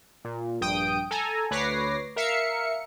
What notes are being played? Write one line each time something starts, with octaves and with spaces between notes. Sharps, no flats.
A#2
A#1 G2 G5 D#6 D7
A4 G#5 A#5
D2 B4 C#5 D6 A#6 C7
A#4 E5 F5 C#7